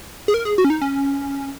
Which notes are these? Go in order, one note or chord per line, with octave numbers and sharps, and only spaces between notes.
G#4
A#4
G#4
F#4
C#4
D#4
C#4